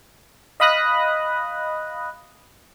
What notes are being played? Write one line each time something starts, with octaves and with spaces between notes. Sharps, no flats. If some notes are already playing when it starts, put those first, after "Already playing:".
D#5 F5 B5 D#6 F#6 A#6